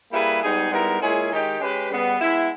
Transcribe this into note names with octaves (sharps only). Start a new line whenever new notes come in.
G3 A#3 E4 G#4 B4
G#2 G3 B3 D#4 G#4
G#2 G3 B3 E4 A#4
A#2 G#3 C#4 E4 G#4
D#3 G#3 D#4 G4
G#3 C#4 G4 B4
C#3 G3 B3
G#3 B3 E4